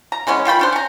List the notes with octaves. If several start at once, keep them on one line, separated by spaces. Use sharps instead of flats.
A#5
E3 G#3 B3 C#4
D#3 F4 G5 B5
C#4 D4 C5
C#4 A#5